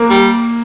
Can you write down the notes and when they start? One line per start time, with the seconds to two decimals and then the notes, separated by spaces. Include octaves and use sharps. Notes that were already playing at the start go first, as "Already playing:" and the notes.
Already playing: A#3
0.10 G3